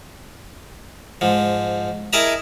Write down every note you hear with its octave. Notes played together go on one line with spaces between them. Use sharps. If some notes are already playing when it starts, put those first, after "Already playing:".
G#2 F3
E4 G#4 A#4 D#5 A5 A#5